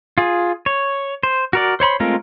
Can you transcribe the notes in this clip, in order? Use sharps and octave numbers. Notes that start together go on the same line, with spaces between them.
F4 G#4
C#5
C5
F#4 A#4 D5
C5 C#5 B5 C6
G#3 A3 C4 F4 A#4